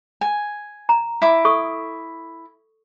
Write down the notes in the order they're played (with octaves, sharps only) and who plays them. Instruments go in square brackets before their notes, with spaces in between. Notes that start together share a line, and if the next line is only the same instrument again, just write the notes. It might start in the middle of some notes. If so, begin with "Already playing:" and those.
[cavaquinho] G#5
[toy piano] A#5
[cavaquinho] E4 D6
[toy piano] A4 C#6 D#6